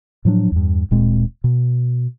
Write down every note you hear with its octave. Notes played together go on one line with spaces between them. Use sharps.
A2 F3 F#3 D4
E2 G2
D1 A#2 G#3 C4
B2